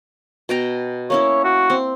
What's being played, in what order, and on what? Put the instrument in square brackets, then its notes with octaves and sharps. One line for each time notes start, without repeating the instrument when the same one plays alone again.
[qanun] B2 G5 A#5
[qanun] A#3 C#4 E4 [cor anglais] C#5
[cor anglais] F#4
[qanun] C4